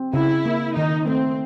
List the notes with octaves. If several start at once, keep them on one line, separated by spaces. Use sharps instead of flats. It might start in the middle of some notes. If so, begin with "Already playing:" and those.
Already playing: C4
C#3 E4
A#3
D#3 D#4
A3 C4